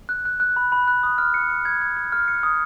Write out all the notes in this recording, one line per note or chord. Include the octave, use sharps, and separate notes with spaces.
F#6
F#6
F#6
B5
B5
F#6
D#6
F6
C#7
C#7
G#6
G#6
G#6
F6
C#7
D#6